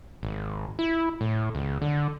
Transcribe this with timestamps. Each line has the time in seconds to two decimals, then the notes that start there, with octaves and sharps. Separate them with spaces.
0.23 G#1
0.79 E4
1.21 A2
1.55 C#2
1.82 D3